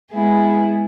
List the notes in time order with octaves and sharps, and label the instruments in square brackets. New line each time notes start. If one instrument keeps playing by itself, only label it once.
[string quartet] G#3 B3 E4 G#4